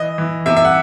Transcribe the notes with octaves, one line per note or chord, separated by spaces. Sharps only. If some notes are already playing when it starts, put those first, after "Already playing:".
Already playing: E3 D#5
E3
C3 E5
E5
F#5